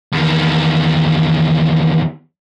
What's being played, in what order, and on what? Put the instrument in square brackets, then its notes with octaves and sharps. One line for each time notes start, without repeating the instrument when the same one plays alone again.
[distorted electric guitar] E2 D#3